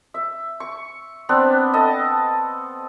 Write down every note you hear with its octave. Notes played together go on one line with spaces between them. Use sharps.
E5
C#6
B3 C4 D4
A4 D#5 A5